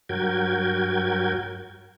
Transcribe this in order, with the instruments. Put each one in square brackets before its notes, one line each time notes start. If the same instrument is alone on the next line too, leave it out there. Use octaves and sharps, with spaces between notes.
[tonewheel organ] G2 F#3 F#4 A#4 G5 G#6